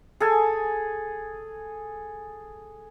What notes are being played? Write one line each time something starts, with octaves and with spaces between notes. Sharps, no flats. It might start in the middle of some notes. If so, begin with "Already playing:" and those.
G#4 A4 G#5